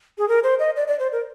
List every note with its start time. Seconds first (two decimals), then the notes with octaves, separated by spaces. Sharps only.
0.18 G#4
0.28 A#4
0.44 C5
0.59 D#5
0.76 D5
0.88 D5
0.99 C5
1.12 A#4